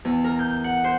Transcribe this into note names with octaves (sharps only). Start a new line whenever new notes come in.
E2
A#4
G6
F#5
C5